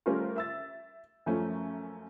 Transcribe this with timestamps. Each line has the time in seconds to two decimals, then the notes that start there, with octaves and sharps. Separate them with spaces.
0.06 G3 A3 C#4 F4 A#4 C5
0.36 E5 E6 A6
1.26 F#2 F3 A3 C#4